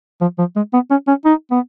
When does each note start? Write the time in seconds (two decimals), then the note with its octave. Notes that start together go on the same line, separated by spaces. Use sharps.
0.21 F3
0.38 F3
0.56 G#3
0.73 B3
0.90 C#4
1.08 C#4
1.25 D#4
1.51 B3